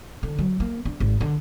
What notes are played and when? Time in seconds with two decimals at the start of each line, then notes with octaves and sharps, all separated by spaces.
0.23 D3
0.39 F#3
0.60 A#3
0.85 D4
1.00 G#1
1.21 D3